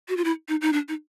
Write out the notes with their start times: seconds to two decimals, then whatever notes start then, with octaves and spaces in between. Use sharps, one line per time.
0.09 F#4
0.17 F4
0.24 E4
0.49 D#4
0.62 D#4
0.73 D4
0.88 D#4